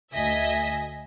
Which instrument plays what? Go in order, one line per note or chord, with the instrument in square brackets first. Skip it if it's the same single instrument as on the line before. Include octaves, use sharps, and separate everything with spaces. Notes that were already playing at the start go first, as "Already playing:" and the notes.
[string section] D2 D#5 E5 G#5 B6